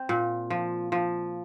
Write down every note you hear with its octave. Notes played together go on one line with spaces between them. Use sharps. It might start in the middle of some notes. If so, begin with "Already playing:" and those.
Already playing: C4
A#2
F3
F3